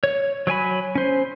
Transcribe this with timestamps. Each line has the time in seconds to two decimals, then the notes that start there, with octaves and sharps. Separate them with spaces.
0.04 C#5
0.47 F#3 C#5 G#5 B5
0.95 C#4 C5